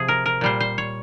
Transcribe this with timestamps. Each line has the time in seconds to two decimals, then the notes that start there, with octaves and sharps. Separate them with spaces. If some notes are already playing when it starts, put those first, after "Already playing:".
Already playing: C3 F3 G#4
0.08 A#4
0.26 A#4
0.41 A#2 G3 C5
0.60 C5
0.78 C#5